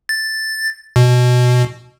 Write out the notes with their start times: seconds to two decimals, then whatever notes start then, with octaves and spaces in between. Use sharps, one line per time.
0.09 A6
0.96 B2